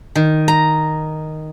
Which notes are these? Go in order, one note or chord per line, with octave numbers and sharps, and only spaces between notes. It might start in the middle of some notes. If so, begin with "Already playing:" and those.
D#3
A#5